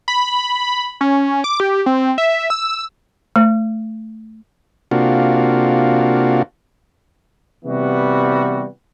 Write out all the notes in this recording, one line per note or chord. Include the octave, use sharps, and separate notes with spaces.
B5
C#4
D6
G4
C4
E5
E6
A3
C3 A#3 D4 F4 F#4
C3 E3 G3 B3 F#4